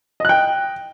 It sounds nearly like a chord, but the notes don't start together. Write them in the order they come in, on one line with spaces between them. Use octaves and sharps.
D#5 F#6 G5